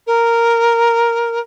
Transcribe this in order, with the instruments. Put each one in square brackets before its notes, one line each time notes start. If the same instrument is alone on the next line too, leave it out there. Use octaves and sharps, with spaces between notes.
[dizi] A#4